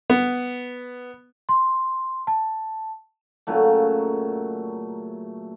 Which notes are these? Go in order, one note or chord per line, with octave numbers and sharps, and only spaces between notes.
B3
C6
A5
A#2 C#3 F#3 A3